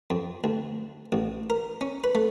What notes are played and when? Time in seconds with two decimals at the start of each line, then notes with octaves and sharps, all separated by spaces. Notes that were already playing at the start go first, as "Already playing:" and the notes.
0.10 F2
0.44 D2
1.12 A1
1.50 A#4
1.81 C#4
2.04 B4
2.15 A3